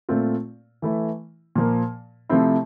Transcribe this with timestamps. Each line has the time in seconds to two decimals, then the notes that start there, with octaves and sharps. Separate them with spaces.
0.09 A#2 A3 C4 F4
0.82 E3 A3 E4
1.55 A#2 F3 A#3
2.29 C3 F3 A3 C4 E4